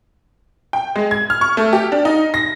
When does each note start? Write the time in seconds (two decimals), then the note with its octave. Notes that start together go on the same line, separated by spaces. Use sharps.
0.73 G5
0.96 G#3
1.11 G#6
1.30 F6
1.41 C#6
1.57 A3
1.73 G4
1.92 D4
2.05 D#4
2.34 A#6